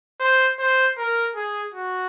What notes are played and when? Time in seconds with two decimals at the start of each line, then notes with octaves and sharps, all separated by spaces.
0.20 C5
0.59 C5
0.98 A#4
1.36 G#4
1.74 F#4